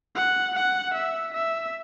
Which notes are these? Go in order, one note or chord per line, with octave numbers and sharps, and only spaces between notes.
F#5
F#5
E5
E5